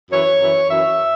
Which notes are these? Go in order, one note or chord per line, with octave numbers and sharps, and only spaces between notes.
F#2 E3 C#5
F#2 E3
F#2 E3 E5